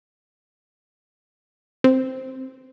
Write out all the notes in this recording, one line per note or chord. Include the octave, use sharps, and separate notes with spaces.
C4